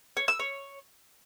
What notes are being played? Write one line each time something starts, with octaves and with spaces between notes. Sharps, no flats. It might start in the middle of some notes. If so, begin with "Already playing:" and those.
C#5
E6
C#5